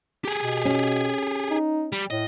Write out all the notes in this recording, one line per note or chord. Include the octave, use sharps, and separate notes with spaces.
G4 G#4
B2
C#4
D#4
G3
A2 D#5